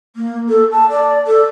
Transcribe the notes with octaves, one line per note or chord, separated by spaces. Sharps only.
A#3
A4
A5
D5
A4